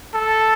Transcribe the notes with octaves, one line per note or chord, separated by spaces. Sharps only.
A4